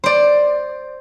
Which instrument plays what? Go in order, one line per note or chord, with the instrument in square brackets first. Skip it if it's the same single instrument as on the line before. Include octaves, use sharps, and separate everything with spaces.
[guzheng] C5 D5